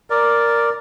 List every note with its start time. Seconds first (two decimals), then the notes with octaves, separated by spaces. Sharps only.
0.10 A#4 D5